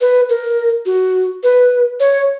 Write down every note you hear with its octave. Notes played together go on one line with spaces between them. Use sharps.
B4
A#4
F#4
B4
C#5